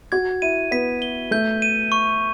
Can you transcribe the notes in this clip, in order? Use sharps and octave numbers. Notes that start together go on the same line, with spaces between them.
F#4 G#6
E4 D#7
B3 B6
G7
A3 G6
D#7
C#6